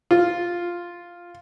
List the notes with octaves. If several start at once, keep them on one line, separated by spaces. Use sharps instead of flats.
F4